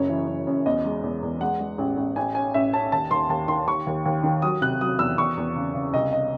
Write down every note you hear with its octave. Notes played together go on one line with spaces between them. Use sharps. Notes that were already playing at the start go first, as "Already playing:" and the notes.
Already playing: F#1 F#2 C#5
E3
F#2
F#2
E2 D#5
G#3
E2
E2
G#3 F#5
G#3
A1
A1
A1 G#5
C#4 G#5
A1 E5
C#4 A5
D#2 A5
D#2 C6
D#2 A5
D#3 C6
D#2 C#6
D#2
D#2
D#3
F#3 D#6
C3 F#6
F#3 D#6
E2 E6
E2 C#6
E2
C#3
C#3
C2 D#5
D#5